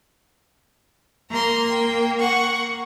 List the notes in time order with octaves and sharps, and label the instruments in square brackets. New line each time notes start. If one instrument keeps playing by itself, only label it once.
[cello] A#3 [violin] A#5 C6
[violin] G5
F#5 C#6